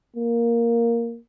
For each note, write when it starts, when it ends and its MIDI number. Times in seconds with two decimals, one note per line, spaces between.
0.16 1.19 58